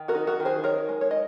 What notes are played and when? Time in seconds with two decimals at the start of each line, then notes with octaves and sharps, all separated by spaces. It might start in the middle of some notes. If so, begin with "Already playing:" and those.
Already playing: D#3
0.08 F#4 A#4
0.15 D#4
0.27 F#4 A#4
0.40 D#3
0.45 G#4 C5
0.64 D#4 A#4 C#5
0.89 G#3
1.01 C#5
1.11 D#5